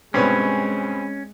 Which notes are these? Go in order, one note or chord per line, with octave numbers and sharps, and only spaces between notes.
G2 B2 G#3 C4 C#4 B4 C#5